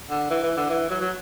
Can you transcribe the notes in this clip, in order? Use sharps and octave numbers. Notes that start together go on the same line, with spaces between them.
D3
E3
E3
D3
E3
F#3
F#3